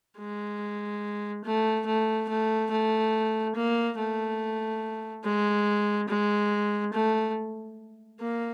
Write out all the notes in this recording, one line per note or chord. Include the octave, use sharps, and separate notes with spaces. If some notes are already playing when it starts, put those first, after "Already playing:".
G#3
A3
A3
A3
A3
A#3
A3
G#3
G#3
A3
A#3